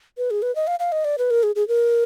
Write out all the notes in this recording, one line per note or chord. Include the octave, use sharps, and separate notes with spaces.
B4
G#4
B4
D#5
F5
F5
D#5
D5
B4
A#4
G#4
G#4
A#4